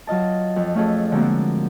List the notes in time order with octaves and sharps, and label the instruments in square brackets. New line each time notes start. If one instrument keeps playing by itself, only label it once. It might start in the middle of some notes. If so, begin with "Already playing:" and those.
[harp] F#3 F4 D#5 A5
F2
A3 C#4 F4 G#4 A4
D3 F3 G#3 A#3 C4 F#4